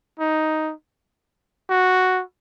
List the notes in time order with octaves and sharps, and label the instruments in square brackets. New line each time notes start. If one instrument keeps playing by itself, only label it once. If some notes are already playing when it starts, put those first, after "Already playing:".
[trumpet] D#4
F#4